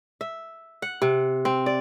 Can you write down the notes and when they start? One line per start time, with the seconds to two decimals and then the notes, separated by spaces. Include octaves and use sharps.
0.21 E5
0.82 F#5
1.02 C3
1.45 C4
1.66 D5